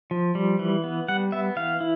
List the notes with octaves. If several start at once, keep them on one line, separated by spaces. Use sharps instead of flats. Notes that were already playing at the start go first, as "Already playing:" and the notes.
F3
G3
E3
B3
G3 F#5
B3 E5
E3 F5
E4